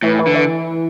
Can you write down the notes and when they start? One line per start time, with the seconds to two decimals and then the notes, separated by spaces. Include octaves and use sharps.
0.03 A2 E3
0.19 E3
0.27 D3
0.35 E3